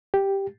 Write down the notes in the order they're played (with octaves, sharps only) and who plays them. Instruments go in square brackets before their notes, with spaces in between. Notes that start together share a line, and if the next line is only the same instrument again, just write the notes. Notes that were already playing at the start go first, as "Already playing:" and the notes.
[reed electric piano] G4